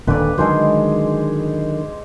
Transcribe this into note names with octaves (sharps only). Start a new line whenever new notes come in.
D#1 D#2 D3 B4 D5
D3 D#3 F#3 G#3 G#4 C5